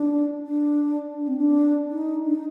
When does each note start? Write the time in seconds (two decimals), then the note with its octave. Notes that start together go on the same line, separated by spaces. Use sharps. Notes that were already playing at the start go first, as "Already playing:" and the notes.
Already playing: D4
0.46 D4
1.19 D4
1.28 C4
1.37 D4
1.90 D#4
2.25 D4
2.34 D#4